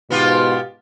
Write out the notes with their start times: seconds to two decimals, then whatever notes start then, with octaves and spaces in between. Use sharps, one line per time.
0.10 G#2 B2 B3 F4 G4